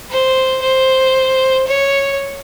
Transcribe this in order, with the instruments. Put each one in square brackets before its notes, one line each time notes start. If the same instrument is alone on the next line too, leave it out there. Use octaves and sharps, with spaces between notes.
[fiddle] C5
C5
C#5